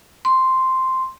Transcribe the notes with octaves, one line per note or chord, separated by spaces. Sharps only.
C6